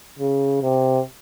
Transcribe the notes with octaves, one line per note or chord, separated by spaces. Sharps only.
C#3
C3